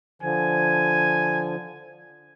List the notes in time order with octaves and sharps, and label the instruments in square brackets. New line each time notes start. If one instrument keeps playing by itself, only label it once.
[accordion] D3 F3 [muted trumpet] G#5